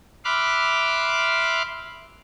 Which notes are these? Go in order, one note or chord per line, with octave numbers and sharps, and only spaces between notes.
E5 B5 C6 D6 F6 F#6